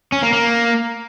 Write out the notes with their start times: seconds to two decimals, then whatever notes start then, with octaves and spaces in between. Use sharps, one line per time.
0.12 C#4
0.22 A#3
0.33 A#3